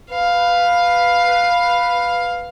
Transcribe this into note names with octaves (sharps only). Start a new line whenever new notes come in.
B4 F5